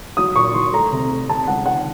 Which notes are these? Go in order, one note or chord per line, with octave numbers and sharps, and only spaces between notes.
F#3 D#6
A#2 C#6
F#3 C6
A3 A#5
C3
A3
C3 A5
C#2 F#5
D#3 F#5